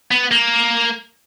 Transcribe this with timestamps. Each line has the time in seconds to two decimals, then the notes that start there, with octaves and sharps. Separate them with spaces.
0.11 B3
0.31 A#3